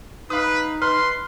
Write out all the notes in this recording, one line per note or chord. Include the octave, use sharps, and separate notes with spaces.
D#4 B4 F5 D#6
B4 C6 F6